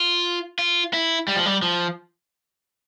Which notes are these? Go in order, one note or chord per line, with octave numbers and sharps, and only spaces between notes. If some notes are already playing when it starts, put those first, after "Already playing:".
Already playing: F4
F4
E4
G3
F3
G3
F3